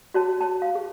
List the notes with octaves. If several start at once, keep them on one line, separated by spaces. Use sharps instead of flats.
F#4 C#5 A5
C#5 A5
F5
G#4